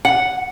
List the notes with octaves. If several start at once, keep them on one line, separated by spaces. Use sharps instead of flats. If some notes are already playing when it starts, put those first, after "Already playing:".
F#5